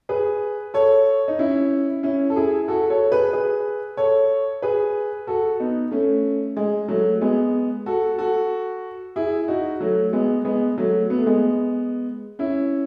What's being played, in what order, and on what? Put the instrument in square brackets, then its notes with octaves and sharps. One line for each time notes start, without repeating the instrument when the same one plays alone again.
[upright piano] G#4 B4
A4 C#5
D#4
C#4 E4
C#4 E4
A4
E4 G#4
F#4 A4
A4 C#5
G#4 B4
G#4 B4
A4 C#5
G#4 B4
F#4 A4
B3 D#4
A3 C#4
G#3
F#3 A3
G#3 B3
F#4 A4
F#4 A4
E4 G#4
D#4 F#4
F#3 A3
G#3 B3
G#3 B3
F#3 A3
B3
A3
G#3 B3
C#4 E4